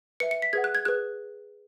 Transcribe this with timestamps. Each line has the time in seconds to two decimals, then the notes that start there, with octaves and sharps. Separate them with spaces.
0.20 B4 E5 C#7
0.31 C#7
0.42 B6
0.53 G#4 B4 F#5 G#6
0.64 F#6
0.75 G#6
0.85 G#4 B4 F#6